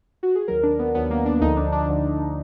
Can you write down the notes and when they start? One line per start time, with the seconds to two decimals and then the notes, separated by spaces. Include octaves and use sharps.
0.23 F#4
0.35 G#4
0.48 D#2 D#3 F#3 A#4
0.63 D4
0.79 B3
0.95 D#2 D#3 F#3 B3
1.10 A#3
1.26 D4
1.41 D2 D3 F3 D#4
1.57 D4
1.72 D4
1.88 D2 D3 F3